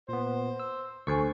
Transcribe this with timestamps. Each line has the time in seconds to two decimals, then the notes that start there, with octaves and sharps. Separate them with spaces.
0.09 A#2 B3 C5
0.60 E6
1.07 D2 A4 C5 G#5 C#6